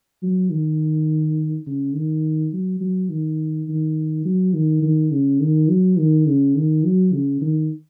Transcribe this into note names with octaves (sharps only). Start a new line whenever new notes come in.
F#3
D#3
C#3
D#3
F#3
F#3
D#3
D#3
F#3
D#3
D#3
C#3
D#3
F#3
D#3
C#3
D#3
F#3
C#3
D#3